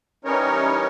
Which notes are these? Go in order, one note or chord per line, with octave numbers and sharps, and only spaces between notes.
E3 G3 C#4 D#4 A#4 C#5